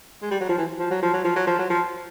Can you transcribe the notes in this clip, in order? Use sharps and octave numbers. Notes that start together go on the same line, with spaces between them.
G#3
G3
F#3
F3
E3
F3
F#3
F3
F#3
F3
F#3
F3
F#3
F3